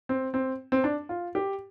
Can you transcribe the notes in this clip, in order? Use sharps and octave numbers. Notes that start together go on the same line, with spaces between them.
C4
C4
C4
D4
F4
G4